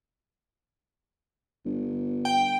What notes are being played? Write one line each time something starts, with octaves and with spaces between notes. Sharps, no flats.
G1
G5